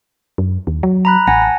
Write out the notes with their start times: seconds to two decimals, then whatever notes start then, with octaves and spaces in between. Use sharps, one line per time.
0.38 F#2
0.67 D#2
0.83 F#3
1.05 A#5 B5 F#6
1.27 A1 F#5 G#5 A#6
1.42 A5